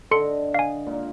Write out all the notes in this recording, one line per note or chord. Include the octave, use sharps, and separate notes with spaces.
D3 A4 D#5 C6 C#7
F5 G#5
A#2 A#3